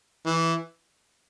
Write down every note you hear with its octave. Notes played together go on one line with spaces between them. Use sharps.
E3